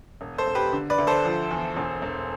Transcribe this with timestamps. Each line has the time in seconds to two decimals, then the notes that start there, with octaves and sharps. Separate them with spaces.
0.21 E1
0.38 A4 C5
0.47 E1
0.55 G4 B4
0.73 D3
0.90 B4 D5
0.98 D2
1.07 A4 C5
1.25 F3
1.51 E2
1.76 E1
2.02 E1